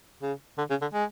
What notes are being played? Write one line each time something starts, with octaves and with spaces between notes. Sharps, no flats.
C#3
D3
C#3
D3
G#3